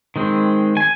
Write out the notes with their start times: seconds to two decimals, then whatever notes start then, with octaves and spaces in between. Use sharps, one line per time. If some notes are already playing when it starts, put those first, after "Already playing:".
0.16 D#3 G#3 C4
0.77 G#5